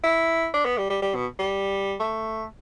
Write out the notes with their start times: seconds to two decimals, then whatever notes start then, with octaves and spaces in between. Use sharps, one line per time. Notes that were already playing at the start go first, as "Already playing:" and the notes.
0.04 E4
0.54 D4
0.65 B3
0.78 G3
0.90 G3
1.02 G3
1.15 B2
1.39 G3
2.00 A3